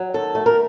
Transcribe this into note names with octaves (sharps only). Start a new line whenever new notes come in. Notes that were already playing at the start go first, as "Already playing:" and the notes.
Already playing: F#3
D#3 A4
A3
A#4